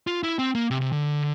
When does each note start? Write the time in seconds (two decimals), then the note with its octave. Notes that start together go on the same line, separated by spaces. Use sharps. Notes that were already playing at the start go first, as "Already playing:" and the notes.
0.07 F4
0.24 E4
0.39 C4
0.55 A#3
0.71 C3
0.81 C3
0.92 D3